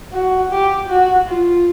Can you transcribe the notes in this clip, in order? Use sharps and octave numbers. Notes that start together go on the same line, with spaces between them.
F#4
G4
F#4
F4